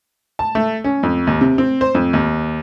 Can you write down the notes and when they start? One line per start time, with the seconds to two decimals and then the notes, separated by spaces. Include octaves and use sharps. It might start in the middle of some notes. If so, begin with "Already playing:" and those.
0.39 A5
0.55 A3
0.84 C#4
1.03 F2
1.27 D#2
1.41 C3
1.58 C4
1.81 C5
1.95 F2
2.13 D#2